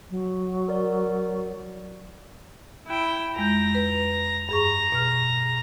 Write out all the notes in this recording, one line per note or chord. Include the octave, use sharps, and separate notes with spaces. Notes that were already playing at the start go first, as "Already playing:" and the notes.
F#3
A#4 D5
E4 G5
F2 G#3 A#5 G6
B4
G2 G#4 A#5 C#6
B2 F6